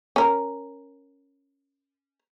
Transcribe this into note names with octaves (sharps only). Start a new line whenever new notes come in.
C#4 A#4